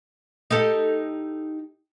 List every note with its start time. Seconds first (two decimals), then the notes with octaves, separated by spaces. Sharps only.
0.51 D#4 G4 A4